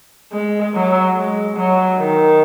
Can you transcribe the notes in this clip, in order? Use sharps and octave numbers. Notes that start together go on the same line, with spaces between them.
G#3
F#3
G#3
F#3
D#3